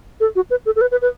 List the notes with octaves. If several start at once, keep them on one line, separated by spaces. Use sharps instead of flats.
A4
F#4
B4
A4
A4
B4
B4
B4